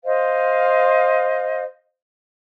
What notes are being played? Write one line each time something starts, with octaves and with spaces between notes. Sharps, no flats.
C5 D#5 F5